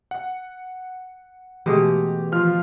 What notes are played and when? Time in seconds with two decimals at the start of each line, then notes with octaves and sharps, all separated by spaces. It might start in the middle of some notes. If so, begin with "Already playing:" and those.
0.11 F#5
1.66 B2 E3 G#3 A3 G4
2.32 F3 F4 F6